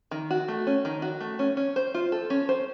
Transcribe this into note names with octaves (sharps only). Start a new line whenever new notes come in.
D#3
F#4
A3
C#4
D#3
F#4
A3
C#4
C#4
C5
F4
A4
C#4
C5